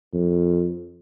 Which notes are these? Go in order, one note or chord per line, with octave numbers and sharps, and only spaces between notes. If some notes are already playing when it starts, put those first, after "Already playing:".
F2